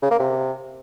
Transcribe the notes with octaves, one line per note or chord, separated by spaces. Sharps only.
C#3
A#3
C3